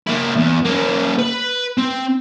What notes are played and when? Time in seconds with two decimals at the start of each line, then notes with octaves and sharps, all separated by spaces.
0.07 A#3 E4
0.36 E2
0.65 A#3 C#4
1.19 B4 B5
1.78 C4